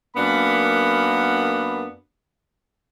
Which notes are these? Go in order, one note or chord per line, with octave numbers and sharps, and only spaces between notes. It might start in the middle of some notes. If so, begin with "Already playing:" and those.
F#2 A#3 B3 D4 B5